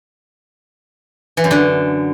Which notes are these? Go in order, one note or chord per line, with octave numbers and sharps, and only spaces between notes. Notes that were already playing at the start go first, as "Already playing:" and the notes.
E3
F#2
D3